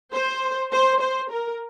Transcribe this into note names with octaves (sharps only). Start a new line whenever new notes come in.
C5
C5
C5
A#4